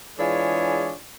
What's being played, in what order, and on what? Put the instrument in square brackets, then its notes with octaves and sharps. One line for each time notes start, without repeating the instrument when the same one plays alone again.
[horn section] E3 G#3 D4 F4 G#4 C#5